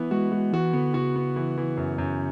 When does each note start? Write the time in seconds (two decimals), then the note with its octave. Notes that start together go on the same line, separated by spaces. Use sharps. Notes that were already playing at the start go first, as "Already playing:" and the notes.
Already playing: E3 B3
0.11 G#3 F#4
0.32 G#3 F#4
0.53 E3 F#4
0.73 D3 B3
0.94 C#3 F#4
1.16 B3
1.36 E3
1.58 E3
1.77 F#2
1.98 F#2